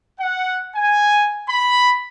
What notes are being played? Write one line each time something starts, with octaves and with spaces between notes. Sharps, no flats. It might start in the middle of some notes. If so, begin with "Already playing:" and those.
F#5
G#5
B5